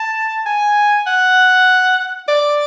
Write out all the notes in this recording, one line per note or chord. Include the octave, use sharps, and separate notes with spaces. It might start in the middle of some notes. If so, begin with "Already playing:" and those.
Already playing: A5
G#5
F#5
D5